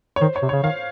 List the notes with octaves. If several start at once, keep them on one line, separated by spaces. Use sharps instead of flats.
C#5
D#3 C5
C#5
C3
C#3 C#5
D#3 F5